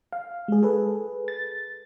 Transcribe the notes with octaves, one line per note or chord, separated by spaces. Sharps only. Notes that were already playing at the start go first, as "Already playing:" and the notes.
F5
G#3 G#4
G#4 A4 B4
A6